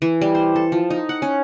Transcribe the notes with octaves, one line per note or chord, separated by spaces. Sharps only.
E3
G3
C5
A4
F3
D#4
F#5
C#4